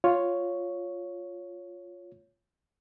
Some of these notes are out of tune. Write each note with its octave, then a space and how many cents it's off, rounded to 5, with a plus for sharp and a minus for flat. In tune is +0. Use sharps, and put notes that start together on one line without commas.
F4 +5 C#5 +5